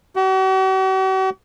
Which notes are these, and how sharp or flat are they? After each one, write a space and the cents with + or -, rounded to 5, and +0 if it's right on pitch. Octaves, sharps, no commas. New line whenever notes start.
F#4 +45